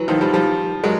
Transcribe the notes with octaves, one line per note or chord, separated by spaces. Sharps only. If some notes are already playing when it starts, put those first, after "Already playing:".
Already playing: E3 F#3
D#3 F3
F3 G3
F3 G3
F#3 G#3